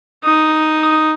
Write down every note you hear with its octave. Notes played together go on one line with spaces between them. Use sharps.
D#4 D#6